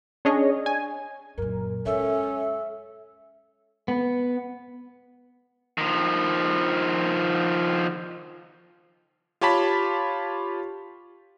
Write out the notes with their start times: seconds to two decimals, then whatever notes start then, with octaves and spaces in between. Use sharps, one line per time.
0.25 C#4 D4 G#4 C#5 D#5
0.66 G#5
1.38 F#2 A#2 A#4
1.86 G#3 C#4 A4 E5
3.88 B3
5.78 D#3 F3
9.41 F4 G4 C#5 A5 B5 B6